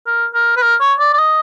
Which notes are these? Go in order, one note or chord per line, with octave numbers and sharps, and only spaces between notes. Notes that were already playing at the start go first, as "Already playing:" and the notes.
A#4
A#4
B4
A#4
C#5
D5
D5
D#5